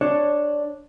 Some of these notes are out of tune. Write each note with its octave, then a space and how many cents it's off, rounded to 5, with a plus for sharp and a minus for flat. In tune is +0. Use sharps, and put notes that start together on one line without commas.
D4 +0 C#5 -10